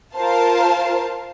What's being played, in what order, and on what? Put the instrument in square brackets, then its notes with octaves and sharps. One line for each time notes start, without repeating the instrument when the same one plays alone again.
[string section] F4 A#4 C5 F5 A5